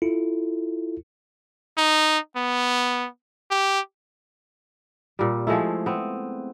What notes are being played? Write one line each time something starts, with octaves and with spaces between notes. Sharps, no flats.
E4 F4 A4
D#4
B3
G4
A#2 G3
F3 G#3 A3 E4
B3 C4